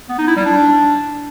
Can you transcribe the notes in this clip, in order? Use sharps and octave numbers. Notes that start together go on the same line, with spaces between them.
B3
D#4
E4
G3
D4